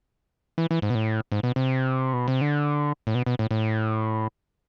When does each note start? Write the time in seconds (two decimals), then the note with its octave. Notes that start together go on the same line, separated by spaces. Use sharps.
0.58 E3
0.71 E3
0.82 G#2
0.90 B2
0.95 A2
1.32 G#2
1.43 B2
1.56 C3
2.13 B2
2.28 C3
2.41 D3
3.07 A2
3.15 B2
3.26 B2
3.39 A2
3.51 A2